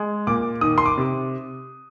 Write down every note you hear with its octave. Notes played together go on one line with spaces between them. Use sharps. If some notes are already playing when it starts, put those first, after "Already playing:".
Already playing: G#3
A#2 D6
D#3 D#6
C6
D6
C3